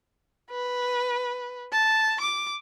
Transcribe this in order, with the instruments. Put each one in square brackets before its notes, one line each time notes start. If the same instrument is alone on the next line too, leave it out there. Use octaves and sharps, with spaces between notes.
[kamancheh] B4
A5
D6